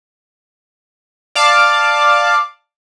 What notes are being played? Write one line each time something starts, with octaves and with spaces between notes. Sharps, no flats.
D5 F5 A5 D6